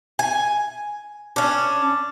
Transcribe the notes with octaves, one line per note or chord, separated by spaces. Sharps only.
G#5
C#4 D4